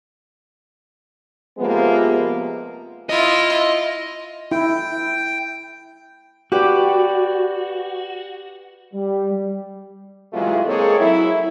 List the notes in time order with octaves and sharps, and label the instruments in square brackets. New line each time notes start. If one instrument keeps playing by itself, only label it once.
[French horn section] C3 F3 G#3 A#3 B3
[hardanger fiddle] E4 F4 [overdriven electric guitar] D#5
[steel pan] E4 [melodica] G5
[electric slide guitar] F#4 [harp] G4 B4 D5
[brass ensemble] G3
[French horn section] C3 E3 F#3 G#3 A3 F4
G#3 A#3 C4 G#4 A4 C#5
F#3 E4